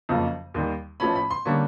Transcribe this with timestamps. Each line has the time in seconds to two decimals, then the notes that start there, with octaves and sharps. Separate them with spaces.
0.09 F#1 F2 C#3 F3 A#3
0.54 D#2 D#3 G3
1.00 A1 A2 F3 A3 C#4 B5
1.15 B5
1.31 C6
1.45 D3 G3 A#3 C#4 C#6